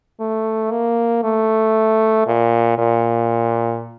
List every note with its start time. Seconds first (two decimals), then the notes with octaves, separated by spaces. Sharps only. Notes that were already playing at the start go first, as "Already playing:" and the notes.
0.20 A3
0.71 A#3
1.24 A3
2.27 A#2
2.78 A#2